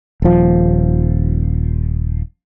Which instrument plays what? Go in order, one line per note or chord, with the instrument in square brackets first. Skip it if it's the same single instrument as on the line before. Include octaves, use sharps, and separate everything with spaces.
[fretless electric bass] D#1 F3